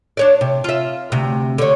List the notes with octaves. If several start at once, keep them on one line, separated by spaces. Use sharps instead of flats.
D4 C#5 D5
C3
F4 E5
D2 C3
D3 C#5